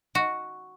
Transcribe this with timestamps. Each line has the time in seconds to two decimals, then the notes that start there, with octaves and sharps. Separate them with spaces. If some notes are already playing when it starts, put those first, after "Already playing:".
0.15 F#4